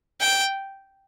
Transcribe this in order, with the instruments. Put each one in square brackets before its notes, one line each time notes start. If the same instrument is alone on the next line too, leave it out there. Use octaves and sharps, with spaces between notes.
[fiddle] G5